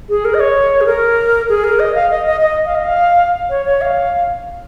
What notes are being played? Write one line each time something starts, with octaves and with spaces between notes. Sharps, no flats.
G#4
A#4
D#5
C#5
G#4
A#4
G#4
A#4
D#5
F5
D#5
D#5
D#5
F5
D#5
F5
C#5
C#5
F5